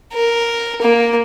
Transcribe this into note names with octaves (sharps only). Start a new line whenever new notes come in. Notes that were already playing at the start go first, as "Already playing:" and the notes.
A#4
A#3